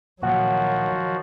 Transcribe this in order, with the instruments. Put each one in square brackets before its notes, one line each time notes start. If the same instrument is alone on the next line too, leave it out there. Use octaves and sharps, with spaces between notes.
[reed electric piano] C#2 A#2 F#5 [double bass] D#3 F#3 [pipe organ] F3 F#4